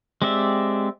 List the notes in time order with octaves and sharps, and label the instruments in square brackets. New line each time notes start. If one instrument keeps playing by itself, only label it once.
[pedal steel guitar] G#3 C4 G4 D5 E5